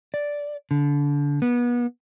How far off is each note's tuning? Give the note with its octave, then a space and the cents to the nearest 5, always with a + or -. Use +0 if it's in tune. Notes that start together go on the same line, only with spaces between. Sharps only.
D5 -5
D3 -25
B3 -30